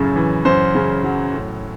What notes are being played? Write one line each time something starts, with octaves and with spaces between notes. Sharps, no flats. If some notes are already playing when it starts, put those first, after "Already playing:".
Already playing: F#2 A2 C#3
E3
F#2 C5
C#3
F#3
A2